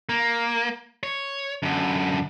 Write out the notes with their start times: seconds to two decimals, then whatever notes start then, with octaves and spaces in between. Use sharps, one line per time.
0.09 A#3
1.03 C#5
1.63 F#2 D3